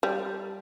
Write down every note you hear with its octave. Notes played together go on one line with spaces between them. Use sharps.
G3